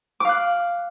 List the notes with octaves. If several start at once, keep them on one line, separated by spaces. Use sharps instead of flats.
F5 D6 F#6